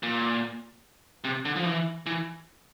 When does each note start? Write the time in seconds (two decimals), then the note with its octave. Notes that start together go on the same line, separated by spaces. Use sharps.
0.03 A#2
1.24 C3
1.45 D3
1.56 F3
1.65 E3
2.06 E3